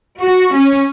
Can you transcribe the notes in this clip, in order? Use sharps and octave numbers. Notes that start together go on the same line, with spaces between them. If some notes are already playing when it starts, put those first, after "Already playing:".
F#4
C#4